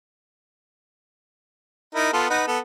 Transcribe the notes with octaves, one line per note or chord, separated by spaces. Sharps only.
D#4 E4 A#4
B3 F4 A4
D#4 B4 F#5
B3 A4